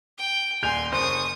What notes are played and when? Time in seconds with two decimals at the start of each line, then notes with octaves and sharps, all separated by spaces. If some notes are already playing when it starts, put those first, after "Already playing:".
0.18 G5
0.63 D#1 G#5 C6 G6 F7
0.92 F#1 C5 C#6 D#6